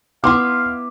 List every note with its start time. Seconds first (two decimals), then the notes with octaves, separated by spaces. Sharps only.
0.24 B3 E4 F5 C6 D6